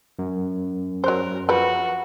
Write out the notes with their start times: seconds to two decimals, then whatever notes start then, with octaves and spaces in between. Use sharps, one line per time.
0.19 F#2
1.04 F#3 A#4 C5
1.49 F3 F#4 B4